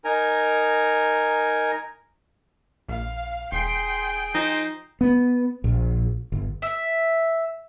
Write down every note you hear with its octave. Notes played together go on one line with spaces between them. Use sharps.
D#4 A#4 G#5 A#5
A#1 F5
E1 G#4 G5 C6
F3 D#4 C5
B3
A#1
G1
E5